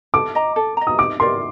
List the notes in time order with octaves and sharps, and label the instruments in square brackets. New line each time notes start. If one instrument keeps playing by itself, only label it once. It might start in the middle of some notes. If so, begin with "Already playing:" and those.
[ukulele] A4 [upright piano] D6
[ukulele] D#5 A#5
A4
D#5 A#5
[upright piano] D#6
[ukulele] D#4 [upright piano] D6
[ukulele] G4 A#4 D5 [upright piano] C6